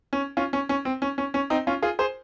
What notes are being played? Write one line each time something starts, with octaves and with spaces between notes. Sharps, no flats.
C#4
C#4 F4
C#4
C#4
C4
C#4
C#4
C#4
C4 D#4
C#4 F4
F4 G#4
G#4 C5